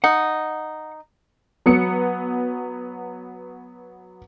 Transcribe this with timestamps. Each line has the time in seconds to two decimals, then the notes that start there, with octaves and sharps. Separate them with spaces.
0.04 D#4 F#5
1.66 F#3 B3 C#7